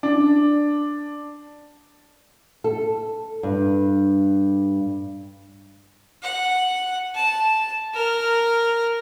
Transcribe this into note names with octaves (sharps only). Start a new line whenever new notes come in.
D4
A4
G2
F#5
A5
A#4 F6